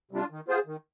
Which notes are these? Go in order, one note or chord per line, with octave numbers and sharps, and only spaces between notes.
C3 G3 D4 F4
D#3
B3 F4 G#4 C5
D#3